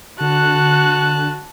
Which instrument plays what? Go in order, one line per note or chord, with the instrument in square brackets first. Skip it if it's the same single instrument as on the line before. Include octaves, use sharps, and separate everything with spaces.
[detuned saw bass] D3 [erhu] F#4 [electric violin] A5 F#6